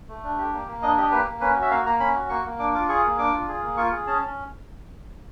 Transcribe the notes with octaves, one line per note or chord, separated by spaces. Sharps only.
A3
D4
G4
A#3
A#3
D4 D#5
G4 D#5
A#3 B4
A#3
C#4 B4
F#4
E5
A#3 F5
A#3 A#5
C#4 B5
F#4
A#3 C#6
A#3
D4 D6
F4 D6
G#4 C#6
A#3
D4 D6
F4
G#4
A#3
F4 C#6
G#4
C#4 A5
C#4